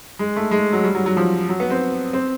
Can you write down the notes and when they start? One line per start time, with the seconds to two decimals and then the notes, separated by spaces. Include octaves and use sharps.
0.19 G#3
0.36 A3
0.51 G#3
0.73 F#3
0.84 G3
0.95 F#3
1.06 F#3
1.17 F3
1.49 F#3
1.60 B3
1.70 C4
2.13 C4